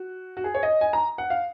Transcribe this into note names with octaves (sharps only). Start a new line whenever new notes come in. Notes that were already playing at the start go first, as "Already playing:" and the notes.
Already playing: F#4
F#4
G#4
C#5
D#5
G#5
A#5
F#5
F5